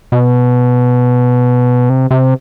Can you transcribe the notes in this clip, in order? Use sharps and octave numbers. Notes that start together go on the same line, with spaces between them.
B2
C3
C3